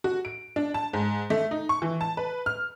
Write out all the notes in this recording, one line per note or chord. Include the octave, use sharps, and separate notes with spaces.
F#4
D7
D4
A5
G#2
A3
D#4
C#6
E3
A5
B4
F6